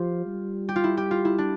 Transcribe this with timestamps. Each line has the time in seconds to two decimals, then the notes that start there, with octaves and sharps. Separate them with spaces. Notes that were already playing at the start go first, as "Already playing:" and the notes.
Already playing: F3 F4 G4
0.27 G3
0.69 G4
0.76 F4
0.84 E4
0.97 G4
1.11 F4
1.25 E4
1.38 D4